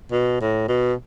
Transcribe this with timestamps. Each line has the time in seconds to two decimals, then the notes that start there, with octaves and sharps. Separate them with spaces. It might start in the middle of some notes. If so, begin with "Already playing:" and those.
0.12 B2
0.41 A2
0.68 B2